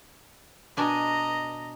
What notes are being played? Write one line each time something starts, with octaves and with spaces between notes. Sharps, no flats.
B2 D4 D#5 G#5 A#5